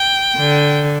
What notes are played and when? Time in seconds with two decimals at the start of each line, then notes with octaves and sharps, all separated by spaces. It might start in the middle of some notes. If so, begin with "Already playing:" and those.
Already playing: G5
0.37 D3